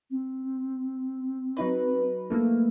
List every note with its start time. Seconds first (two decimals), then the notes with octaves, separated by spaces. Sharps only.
0.11 C4
1.57 F#3 D#4 B4
2.30 A3 A#3